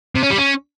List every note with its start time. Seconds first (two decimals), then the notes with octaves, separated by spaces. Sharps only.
0.15 C3
0.23 C#4
0.30 G3
0.38 C#4